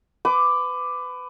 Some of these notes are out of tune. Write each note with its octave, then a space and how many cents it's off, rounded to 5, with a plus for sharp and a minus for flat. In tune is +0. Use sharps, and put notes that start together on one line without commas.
B4 +25 D6 +5